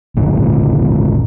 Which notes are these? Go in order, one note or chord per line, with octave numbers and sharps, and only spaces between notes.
G#1 D2 A#2 D3